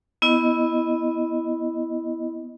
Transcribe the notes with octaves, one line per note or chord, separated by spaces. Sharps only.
B3 E4 D#5